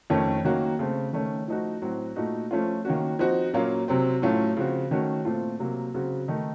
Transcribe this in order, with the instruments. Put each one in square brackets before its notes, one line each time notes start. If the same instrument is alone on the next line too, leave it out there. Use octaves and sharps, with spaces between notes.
[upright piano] F2 D#3 A3 C#4
D#3 F#3 A#3 C#4 F#4
C#3 A3 C4
D#3 A3 C#4
F3 A3 D#4 F#4
A2 F#3 C4 F#4
A#2 A3 D#4 F#4
F3 A3 C#4 F4
D#3 A#3 C#4 F#4
F3 C4 D#4 F#4
A#2 F#3 A#3 C#4 F4
C3 F#3 C4
A2 F#3 A3 C#4 F4
C#3 F3 C4 F#4
D#3 A3 C#4 F#4
A#2 A3 C4 F4
C3 F#3 A#3
C#3 F#3 C4 F#4
D#3 A3 D#4